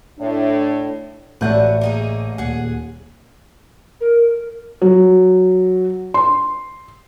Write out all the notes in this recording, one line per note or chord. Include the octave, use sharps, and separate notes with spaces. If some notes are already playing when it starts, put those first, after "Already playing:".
A2 D4
A1 D3 A3 F#4 B4 G6
A#3 D#4 G#4
D#1 G#4 F#5
A#4
F#3
C6